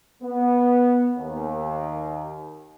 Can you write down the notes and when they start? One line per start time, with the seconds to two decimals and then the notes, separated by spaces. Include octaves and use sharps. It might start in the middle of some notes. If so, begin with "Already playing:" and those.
0.22 B3
1.17 D#2